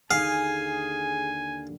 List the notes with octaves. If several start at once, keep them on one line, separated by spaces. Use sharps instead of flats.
D#2 D3 G#4 F5 G#5